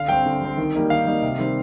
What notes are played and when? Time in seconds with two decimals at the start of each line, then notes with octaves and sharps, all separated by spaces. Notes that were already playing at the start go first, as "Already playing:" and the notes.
Already playing: D3 F5
0.09 G3 C4 G5
0.26 D3
0.42 G3 C4
0.57 D#3
0.75 G3 A#3 D#4
0.90 D#3 F5
1.07 G3 A#3 D#4
1.22 C3
1.39 D#3 G3 C4